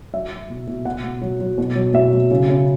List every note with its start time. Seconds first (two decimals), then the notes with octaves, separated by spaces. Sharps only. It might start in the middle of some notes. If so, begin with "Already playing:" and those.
0.13 F#3 E5
0.32 F#3
0.50 B2
0.67 B2
0.85 B2 F#5
1.04 B2
1.22 F#3
1.41 F#3
1.58 B2
1.75 F#3
1.94 B2 E5
2.13 F#3
2.31 C#3
2.49 C#3